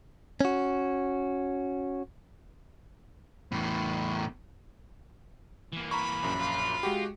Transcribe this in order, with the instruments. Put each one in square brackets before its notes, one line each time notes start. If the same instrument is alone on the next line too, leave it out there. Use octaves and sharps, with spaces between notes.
[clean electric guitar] C#4 F#4
[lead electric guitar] E2 A2
[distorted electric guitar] E3 A#3
[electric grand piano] A#5 C#6 [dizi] B5
[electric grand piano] A#1 F#2
[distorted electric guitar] F4
[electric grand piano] G#3 F#4 G4